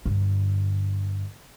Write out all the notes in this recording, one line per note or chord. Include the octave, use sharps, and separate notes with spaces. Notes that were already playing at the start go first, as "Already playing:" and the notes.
G2 D3